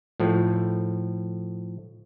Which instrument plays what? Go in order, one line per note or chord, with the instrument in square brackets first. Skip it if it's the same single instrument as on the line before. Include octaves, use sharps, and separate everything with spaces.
[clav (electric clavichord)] A2 F3